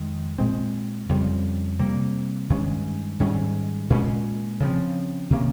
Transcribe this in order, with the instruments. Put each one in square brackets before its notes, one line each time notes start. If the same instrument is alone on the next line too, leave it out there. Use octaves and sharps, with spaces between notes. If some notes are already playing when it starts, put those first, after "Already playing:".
Already playing: [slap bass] F2 D#3 G#3
A#2 G#3 C4
F2 C#3 G3 C4
C3 G3 A#3
G2 D#3 G#3 C#4
G#2 D#3 G3 C#4
A#2 G#3 C#4
C#3 F3 C4
C3 D#3 A#3 C#4